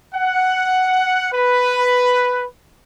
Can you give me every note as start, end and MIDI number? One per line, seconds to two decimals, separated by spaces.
0.15 1.27 78
1.32 2.44 71